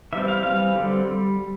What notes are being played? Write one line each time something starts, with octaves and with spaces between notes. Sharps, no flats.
E3 G3 C4 E5
F5
E3 G3 C4 F5
D3 G3 C4
G3